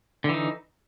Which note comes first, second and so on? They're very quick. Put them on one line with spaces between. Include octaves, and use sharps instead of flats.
D3 E3 D#4